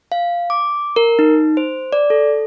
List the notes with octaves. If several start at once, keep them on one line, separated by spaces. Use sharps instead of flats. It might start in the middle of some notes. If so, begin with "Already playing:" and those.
F5
D6
A#4
D#4
C5
D5
A4